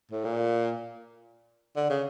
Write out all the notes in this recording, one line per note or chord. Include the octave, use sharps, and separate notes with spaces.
A2
A#2
D3
C#3